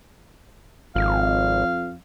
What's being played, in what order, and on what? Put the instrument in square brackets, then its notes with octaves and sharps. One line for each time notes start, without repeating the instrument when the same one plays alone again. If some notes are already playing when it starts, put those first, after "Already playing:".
[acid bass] G#1 [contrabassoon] F2 [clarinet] F5